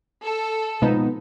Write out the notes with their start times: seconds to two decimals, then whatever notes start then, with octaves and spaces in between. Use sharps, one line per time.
0.24 A4
0.82 B2 F3 G#3 B3 C4 D#4